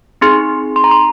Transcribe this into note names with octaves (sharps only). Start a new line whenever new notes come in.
C4 D#4 G#4 C6
C6
A#5
C6